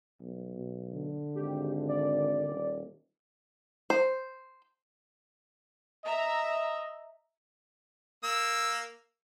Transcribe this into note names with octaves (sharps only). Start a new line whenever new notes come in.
B1
B2
D3
G#1 G4
D5
D#1
C5
D#5 E5 A#5
A#3 E6